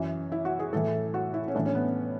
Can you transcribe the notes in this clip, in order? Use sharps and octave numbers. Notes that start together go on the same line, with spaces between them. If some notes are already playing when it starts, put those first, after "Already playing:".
Already playing: F#2 E3
E4
F#4
G#4
A2 E3 A4
F#4
E4
C#4
A2 E3 D4
C#4
B3